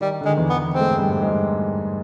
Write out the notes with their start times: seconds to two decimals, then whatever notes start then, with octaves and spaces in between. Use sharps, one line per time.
0.01 D#3 G3
0.21 D3
0.25 G#3
0.29 D#3
0.37 E2 E3
0.49 B3
0.73 G#3 C4
0.81 A3
0.88 G#2 G#3
0.98 G2 G3
1.22 G#2 G#3